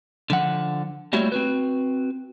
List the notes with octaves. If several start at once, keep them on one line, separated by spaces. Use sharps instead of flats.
D3 F3 F#5
G3 A3 A#3 E4 F#4 C#5
C4 F#4 B4